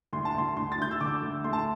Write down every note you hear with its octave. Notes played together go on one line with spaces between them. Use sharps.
D2 C6
A5
D2 C6
D2 C6
A6
D2 G6
E6
D3 D6
D2
A3 C6
A5